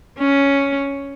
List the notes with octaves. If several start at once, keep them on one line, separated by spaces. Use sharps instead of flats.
C#4